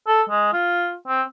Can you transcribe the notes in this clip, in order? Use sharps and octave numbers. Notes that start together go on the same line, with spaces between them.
A4
G#3
F4
C4